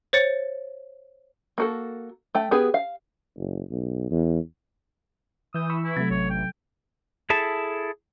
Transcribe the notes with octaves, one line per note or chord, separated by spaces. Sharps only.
C5 C#5 A6 C#7
A#3 F#4 A4
A3 G5
B3 G4 G#4 B4
F5
F#1
B1
E2
E3 D#6 E6 G6
B5 C#6 E6
E4
C3 F#3 A3
A1 C#5
G5
E4 G#4 A4 A5